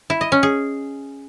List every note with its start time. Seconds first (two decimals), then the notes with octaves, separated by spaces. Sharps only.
0.10 E4
0.21 D#5
0.32 C#4
0.43 G#4